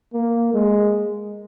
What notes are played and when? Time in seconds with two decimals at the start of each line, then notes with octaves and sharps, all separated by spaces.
0.13 A#3
0.54 G#3